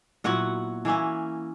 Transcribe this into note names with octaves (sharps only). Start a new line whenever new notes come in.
A#2 F#3 B3 E4 F#4 F#5
E3 A#3 C#4 E4